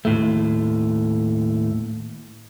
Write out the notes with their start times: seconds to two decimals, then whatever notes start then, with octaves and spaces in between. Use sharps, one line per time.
0.05 D#2 A2 A3